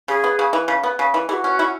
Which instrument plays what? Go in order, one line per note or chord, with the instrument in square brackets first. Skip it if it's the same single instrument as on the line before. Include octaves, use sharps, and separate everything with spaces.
[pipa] C#3 [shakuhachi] G#4
[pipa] B3
C#3
E3
C#3
B3
C#3
E3
[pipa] E3 [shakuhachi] G#4
[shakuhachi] F#4
[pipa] C#4
E4